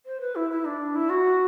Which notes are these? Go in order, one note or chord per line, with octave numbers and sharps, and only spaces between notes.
C5
B4
E4
E4
D4
E4
F#4